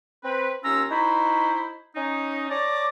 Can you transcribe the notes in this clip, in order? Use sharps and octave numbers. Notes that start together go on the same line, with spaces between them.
C4 B4
D#2 C#4 F4 A#5 E6
D#4 E4 F#4 C5 B5
C#4 D#4
C#5 D5 A5 A#5 D6